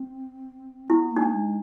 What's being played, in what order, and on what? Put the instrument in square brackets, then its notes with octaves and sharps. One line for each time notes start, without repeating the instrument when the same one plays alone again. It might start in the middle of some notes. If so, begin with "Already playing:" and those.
Already playing: [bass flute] C4
[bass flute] B3 [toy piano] E4
[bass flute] A#3
[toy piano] D#4
D4
[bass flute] G#3